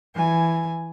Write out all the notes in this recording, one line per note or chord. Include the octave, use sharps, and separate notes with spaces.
E3 G#5